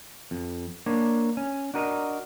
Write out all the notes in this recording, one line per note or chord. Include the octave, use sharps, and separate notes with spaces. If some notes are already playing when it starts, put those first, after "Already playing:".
F2
A#3 D4 C#5
C#4
D4 F#4 A#4 D#5